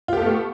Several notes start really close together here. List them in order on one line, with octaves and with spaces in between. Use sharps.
F4 G4 A4 B3 A3